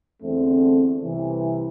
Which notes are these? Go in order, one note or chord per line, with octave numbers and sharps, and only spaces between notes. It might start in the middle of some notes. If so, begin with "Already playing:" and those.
E2 D3 A3 C4
C2 C3 E3